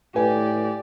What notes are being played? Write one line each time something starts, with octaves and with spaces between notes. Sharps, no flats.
A2 G4 B4 D5 G#5